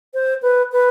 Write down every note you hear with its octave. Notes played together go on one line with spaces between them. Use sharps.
C5
B4
B4